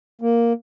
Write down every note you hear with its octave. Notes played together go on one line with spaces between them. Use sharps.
A#3